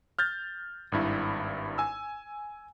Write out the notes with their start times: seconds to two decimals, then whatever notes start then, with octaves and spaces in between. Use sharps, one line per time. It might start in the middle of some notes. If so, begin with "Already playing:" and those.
0.19 F6 G6 A6
0.92 G#1 G2 E4
1.78 G#5 E6